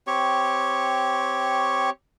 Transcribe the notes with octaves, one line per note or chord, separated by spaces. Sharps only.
C4 G4 C#5 C#6